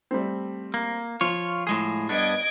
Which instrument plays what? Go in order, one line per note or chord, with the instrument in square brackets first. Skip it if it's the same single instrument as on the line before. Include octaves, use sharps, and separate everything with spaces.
[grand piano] G3 A3 C4
[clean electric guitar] A#3
[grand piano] F3 [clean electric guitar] F4 C#5
[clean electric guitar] A2 G#3 G#4
[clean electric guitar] G2 B3 D4 [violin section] D#5 G#6 D7